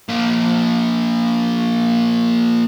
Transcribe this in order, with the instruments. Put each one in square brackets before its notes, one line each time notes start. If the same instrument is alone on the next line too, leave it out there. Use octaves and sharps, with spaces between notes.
[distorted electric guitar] A#2 F3